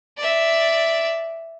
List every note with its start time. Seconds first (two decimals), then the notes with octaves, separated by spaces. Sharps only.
0.18 D5 E5